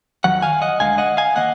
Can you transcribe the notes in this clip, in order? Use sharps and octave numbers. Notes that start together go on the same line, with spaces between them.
F2 D#3 F#3 F#5
F5 G#5
D#5 F#5
D2 D3 G#3 F5 G#5
D#5 F#5
F5 G#5
D#3 A#3 D#5 F#5